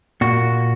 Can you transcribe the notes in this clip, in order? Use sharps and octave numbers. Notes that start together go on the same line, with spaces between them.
A#2 F#4